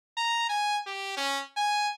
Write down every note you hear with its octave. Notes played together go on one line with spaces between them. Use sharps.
A#5
G#5
G4
C#4
G#5